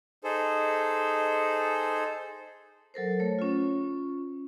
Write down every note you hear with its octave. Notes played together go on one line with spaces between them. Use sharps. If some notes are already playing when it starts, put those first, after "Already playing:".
D#4 G#4 A4 C5
F#3 A4 A#4 C5
A3 C#5
C#4 F4